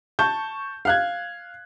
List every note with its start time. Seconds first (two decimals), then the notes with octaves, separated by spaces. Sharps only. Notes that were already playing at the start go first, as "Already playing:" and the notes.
0.19 A5 C#6 G6
0.85 F5 F#6 G#6